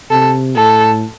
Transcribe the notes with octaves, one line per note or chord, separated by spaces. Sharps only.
C3 A4
A2 A4